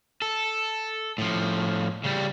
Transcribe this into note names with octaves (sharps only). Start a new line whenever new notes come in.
A4
A2 F3
C#3 G3